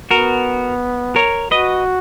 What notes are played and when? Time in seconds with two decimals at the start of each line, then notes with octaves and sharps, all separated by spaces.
0.11 B3 F#4 A#4
1.16 A#4 C#5
1.51 F#4 B4 D#5